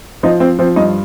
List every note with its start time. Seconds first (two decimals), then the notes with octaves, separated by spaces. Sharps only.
0.23 F3 D#4
0.40 F3 C4
0.59 F3 C4
0.76 G2 D#4